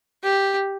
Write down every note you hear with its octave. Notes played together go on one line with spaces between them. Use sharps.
G4